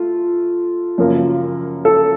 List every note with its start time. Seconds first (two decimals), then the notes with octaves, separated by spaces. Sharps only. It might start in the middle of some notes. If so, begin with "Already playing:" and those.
Already playing: A3 F4
0.98 F#2 C#3 F3 A#3
1.85 A4